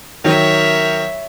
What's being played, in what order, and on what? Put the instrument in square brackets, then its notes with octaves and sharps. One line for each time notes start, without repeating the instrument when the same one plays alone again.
[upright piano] D#3 F#3 [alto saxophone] A#4 [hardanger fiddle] C#5 E5